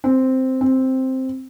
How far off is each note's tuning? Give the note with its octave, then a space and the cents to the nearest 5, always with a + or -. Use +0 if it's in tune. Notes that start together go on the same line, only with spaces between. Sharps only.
C4 -5
C4 +0